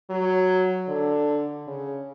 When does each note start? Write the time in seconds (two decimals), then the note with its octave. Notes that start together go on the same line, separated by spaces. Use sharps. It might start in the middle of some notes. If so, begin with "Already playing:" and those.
0.10 F#3
0.89 D3
1.67 C#3